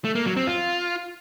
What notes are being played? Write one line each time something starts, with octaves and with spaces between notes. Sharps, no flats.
A3
A#3
F#3
C4
F4